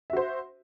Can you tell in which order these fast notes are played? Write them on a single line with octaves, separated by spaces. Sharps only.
E5 F#4 C5